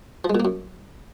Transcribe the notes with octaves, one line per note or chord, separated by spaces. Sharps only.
F3
G#3
A#2
A#3
F#2